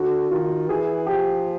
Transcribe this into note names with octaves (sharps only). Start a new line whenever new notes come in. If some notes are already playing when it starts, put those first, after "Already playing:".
Already playing: D3 F#4
D#3 F4
E3 G#4
F3 G4